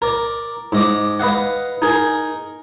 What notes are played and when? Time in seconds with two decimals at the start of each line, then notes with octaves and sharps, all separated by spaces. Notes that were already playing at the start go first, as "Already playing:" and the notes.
0.02 A#4 D5
0.72 G#2 D#5 D6
1.19 B4 D#5 F5 F#5
1.82 D#4 G#4 A#4